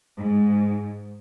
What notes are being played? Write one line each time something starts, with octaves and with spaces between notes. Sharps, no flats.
G#2